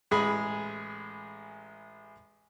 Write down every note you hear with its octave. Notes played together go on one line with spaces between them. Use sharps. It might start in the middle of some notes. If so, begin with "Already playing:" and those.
A1 G#3 G#4 B5